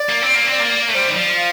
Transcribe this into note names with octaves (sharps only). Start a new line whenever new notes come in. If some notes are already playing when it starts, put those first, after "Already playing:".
Already playing: D5
A#3
C4
A#3
C4
D5
A#3
A3
G3 C5
D#3
F3 D5
F5